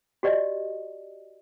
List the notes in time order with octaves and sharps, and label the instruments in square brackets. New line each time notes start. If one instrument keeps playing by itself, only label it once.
[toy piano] F#4 G4 D5 D#5